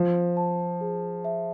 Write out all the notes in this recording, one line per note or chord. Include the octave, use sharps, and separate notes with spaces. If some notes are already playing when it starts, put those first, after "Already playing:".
Already playing: F3 C5
A5
G#4
E5